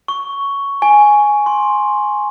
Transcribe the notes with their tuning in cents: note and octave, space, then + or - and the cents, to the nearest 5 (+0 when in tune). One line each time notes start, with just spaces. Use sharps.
C#6 +5
G#5 +5
C6 +10